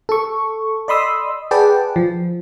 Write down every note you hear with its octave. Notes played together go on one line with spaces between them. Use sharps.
A4 C#6
D5 D#5 B5 C6 D#6 E6
G#4 B4 D5 F#5 G5 A5
F3